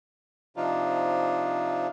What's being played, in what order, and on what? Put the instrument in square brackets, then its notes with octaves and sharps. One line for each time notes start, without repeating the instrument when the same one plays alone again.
[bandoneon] C3 F3 D4 D#4 F4